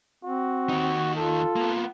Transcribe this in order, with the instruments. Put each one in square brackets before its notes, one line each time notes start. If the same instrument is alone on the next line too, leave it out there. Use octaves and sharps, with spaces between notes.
[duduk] C4 [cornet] F#4
[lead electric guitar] D#2 D#4
[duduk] F4 [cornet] A4
[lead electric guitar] A#3 B3